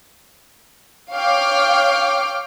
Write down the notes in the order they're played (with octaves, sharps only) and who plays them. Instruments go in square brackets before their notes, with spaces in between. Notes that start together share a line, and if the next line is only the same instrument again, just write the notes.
[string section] C#5 F5 G5 D6 F6